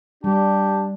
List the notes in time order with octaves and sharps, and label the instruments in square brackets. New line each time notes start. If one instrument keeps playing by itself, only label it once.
[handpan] G3 [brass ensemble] D4 [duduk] G4 [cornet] A5